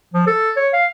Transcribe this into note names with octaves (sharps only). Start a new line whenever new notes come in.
F3
A4
C#5
F5